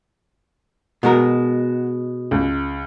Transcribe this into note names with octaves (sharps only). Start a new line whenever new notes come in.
B2 G#3 F#4 A#4
C#2